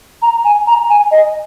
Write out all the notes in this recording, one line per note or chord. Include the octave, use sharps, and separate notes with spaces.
A#5
G#5
A#5
G#5
D#5